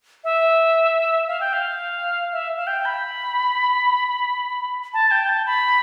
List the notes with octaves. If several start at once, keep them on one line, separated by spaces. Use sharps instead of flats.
E5
F5
G5
F5
E5
F5
G5
B5
A5
G5
A5
B5